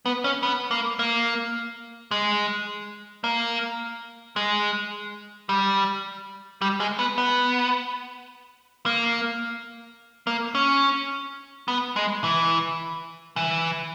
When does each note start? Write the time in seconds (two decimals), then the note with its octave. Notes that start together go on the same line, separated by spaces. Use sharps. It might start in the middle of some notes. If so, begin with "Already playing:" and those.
0.06 B3
0.24 C#4
0.43 B3
0.71 A#3
0.99 A#3
2.11 G#3
3.24 A#3
4.36 G#3
5.49 G3
6.62 G3
6.80 G#3
6.99 B3
7.18 B3
8.86 A#3
10.27 A#3
10.55 C#4
11.68 B3
11.96 G#3
12.24 E3
13.36 E3